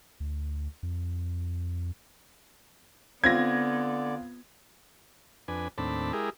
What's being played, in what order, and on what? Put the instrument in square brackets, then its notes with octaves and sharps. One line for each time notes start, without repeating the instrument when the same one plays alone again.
[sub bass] D2
F2
[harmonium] D3 D5 [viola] B3 [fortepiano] C4 F4 [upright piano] G#6 A#6
[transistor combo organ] F2 D4 B4 G#5
D#2 A2 C4 D4 A5 B5
G#3 E4 G4 G#4 A#4